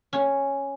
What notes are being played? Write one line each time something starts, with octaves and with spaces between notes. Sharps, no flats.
C#4